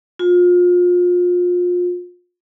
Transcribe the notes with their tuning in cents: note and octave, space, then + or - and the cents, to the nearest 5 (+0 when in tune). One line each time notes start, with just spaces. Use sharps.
F4 +30